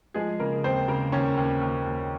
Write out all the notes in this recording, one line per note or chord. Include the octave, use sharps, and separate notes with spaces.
F3 G#3 G#4
C#3 A#3 A#4
D#2 C4 C5
C#3 A#3 A#4
D#2 C#4 C#5
D#2
D#2
D#2